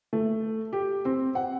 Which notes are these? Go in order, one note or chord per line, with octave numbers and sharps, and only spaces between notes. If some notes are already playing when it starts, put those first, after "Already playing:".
A3
G4
C4
F#5